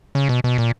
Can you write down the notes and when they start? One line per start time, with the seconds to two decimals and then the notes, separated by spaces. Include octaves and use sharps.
0.15 C#3
0.29 B2
0.44 B2
0.58 A#2